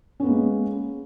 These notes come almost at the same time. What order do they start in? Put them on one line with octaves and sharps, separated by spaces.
C#4 B3 A#3 G#3